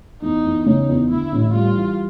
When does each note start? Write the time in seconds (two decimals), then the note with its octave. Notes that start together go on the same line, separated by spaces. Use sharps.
0.21 E2 D#4
0.44 E2
0.66 C#3 D#4
0.88 E2
1.10 D3 E4
1.32 A1
1.53 G3 F4
1.75 E3